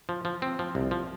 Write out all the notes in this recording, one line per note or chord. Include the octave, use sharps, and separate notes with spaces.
F3
F3
C4
F3
C2
F3